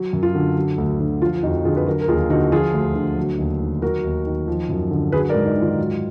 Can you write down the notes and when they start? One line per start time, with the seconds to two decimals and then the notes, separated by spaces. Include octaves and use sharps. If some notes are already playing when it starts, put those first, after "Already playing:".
Already playing: F#3
0.13 F#2
0.23 F4
0.35 D3
0.56 F#3
0.78 D2
1.00 D3
1.21 F3 F4
1.43 F2 D#4 F#4
1.65 D3 F4 G#4
1.77 B4
1.86 F#3 F#4 A#4
2.01 A#4
2.08 D#2 F4 G#4
2.30 D3 D#4 F#4
2.52 F3 F4 G#4
2.74 D2
2.95 D3
3.17 F#3
3.38 D#2
3.61 D#3
3.82 F#3 F#4 A#4
4.04 D#2
4.26 D#3
4.48 F3
4.69 F#2
4.91 D3
5.12 F#3 G#4 B4
5.29 A#4 D5
5.35 G#2
5.45 D#4
5.57 D#3 F4
5.78 F#3